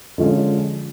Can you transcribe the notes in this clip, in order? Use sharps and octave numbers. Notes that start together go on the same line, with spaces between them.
D3 F3 G#3 C#4